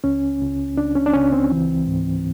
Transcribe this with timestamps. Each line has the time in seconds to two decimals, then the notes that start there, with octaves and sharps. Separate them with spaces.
0.04 C#2 C#4
0.41 C#2
0.77 C#2 D4
0.96 C#4
1.06 D4
1.13 C#2 C#4
1.32 C4
1.51 E3
1.87 G#2